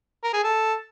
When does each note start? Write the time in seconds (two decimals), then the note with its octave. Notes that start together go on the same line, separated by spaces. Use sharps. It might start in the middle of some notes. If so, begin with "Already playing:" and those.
0.24 A#4
0.34 G#4
0.43 A4